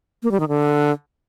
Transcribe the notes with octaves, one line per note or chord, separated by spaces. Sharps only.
A#3
G3
D#3
D3